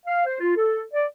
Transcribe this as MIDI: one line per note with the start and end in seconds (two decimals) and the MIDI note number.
0.05 0.25 77
0.25 0.38 72
0.40 0.53 65
0.55 0.81 69
0.94 1.05 74